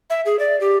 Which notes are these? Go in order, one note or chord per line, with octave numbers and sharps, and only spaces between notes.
E5
G#4
D5
G4